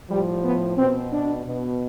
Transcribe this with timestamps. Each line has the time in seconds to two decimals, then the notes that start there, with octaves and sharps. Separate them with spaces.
0.10 A2 F3 G3
0.44 B3
0.78 B2 C4
1.12 D4
1.46 B2